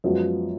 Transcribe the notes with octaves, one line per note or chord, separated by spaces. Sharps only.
F#2 F3 G#3 B3 F#4